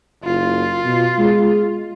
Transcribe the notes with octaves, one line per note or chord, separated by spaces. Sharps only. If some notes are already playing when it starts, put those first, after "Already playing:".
F#1 F4
B2
G#3